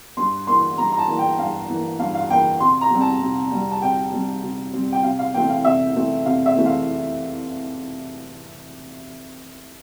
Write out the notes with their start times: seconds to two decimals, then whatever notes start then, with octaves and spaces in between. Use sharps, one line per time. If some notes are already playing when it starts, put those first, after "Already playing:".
0.17 G2 C6
0.47 E3 A#3 C6
0.78 G2 A#5
0.92 A#5
0.98 A5
1.08 E3 A#3
1.19 G5
1.38 G2 F5
1.69 E3 A#3
1.99 G2 F5
2.15 F5
2.30 E3 A#3 G5
2.60 C3 C6
2.81 A#5
2.91 G3 C4
3.01 A5
3.21 C3
3.51 G3 C4
3.71 A5
3.82 C3 G5
4.13 G3 C4
4.43 C3
4.73 G3 C4
4.93 G5
5.03 C3 F5
5.19 F5
5.33 E3 G5
5.37 A3 C4
5.50 F5
5.65 C3 E5
5.95 E3 A3 C4
6.26 C3 F5
6.46 E5
6.56 E3 A3 C4
6.66 F5